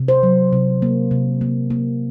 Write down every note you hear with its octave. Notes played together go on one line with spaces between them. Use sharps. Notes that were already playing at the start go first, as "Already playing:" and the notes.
Already playing: C3
C5
F#3
C3
A#3
C3
A#3
A#3